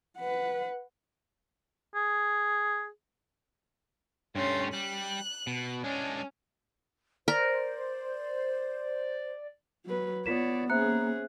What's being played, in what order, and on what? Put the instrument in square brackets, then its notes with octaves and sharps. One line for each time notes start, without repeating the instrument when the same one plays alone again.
[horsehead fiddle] B4 F#5
[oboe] G#4
[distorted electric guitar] G2 A3 [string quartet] C#4 C6
[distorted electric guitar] G3 [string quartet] F#6
[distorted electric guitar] B2
[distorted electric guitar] G#3 D4 [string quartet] C#4
[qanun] A#4 [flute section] C5 [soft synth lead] D5
[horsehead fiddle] F#3 B4
[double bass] B3 [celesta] F4 B6 E7 [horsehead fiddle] C#5 D5
[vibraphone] A#3 [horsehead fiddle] C#4 G#4 [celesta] C5 E5 F#6